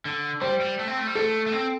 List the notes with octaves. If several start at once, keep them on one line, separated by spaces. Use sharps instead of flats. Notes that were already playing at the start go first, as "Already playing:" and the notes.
D3
G3 C5
G3
A3
C4
A3
G3
A3 A4
A3
C4